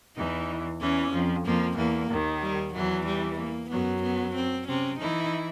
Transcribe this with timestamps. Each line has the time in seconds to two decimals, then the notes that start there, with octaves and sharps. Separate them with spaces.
0.16 E2 E3 D#4
0.81 E2 E3 C#4
1.12 F2 F3
1.45 F2 F3 A#3
1.77 E2 E3 A#3
2.10 D#2 D#3
2.42 G3
2.74 E2 E3 F#3
3.07 G3
3.39 A#3
3.71 F#2 F#3 B3
4.03 B3
4.36 C4
4.67 C3 C4 C#4
5.00 E3 D#4 E4